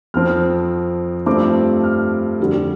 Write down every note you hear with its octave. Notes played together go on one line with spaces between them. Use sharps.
F2 F3 C4 F6
G2 F3 A3 C4 D6
F6
F2 D3 G3